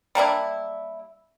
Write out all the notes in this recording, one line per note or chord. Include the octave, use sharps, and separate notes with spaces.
G3 A#3 D4 E4